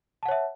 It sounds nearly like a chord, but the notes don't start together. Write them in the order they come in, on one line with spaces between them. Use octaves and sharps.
A5 F#5 C#5 E5